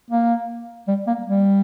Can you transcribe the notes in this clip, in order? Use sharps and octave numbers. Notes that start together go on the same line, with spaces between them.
A#3
G3
A#3
G3